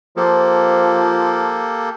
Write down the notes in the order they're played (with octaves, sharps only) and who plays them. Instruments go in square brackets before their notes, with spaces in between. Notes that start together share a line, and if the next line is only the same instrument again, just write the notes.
[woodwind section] F3 [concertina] A#3 G4 A4